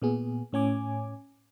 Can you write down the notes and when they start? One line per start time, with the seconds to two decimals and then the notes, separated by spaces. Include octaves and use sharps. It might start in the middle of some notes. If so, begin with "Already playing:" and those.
0.02 A#2 B3 G#4
0.53 A2 C#4 G#5 D6